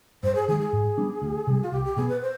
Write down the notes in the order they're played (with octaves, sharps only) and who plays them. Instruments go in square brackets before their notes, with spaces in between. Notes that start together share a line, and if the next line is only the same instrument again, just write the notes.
[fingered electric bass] G2 [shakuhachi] C5
[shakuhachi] G#4
[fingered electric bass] D#3 [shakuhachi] G#4
[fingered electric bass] G#3
[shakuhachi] G#4
[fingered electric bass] G#2
G3 B3 D4
D2
C3 G3
[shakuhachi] F4
[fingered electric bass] C2 [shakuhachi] G4
[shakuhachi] G4
[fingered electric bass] B2 B3 [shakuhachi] G#4
[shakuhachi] B4
C5